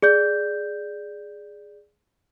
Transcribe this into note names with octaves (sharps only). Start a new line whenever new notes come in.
G#4 D5 G6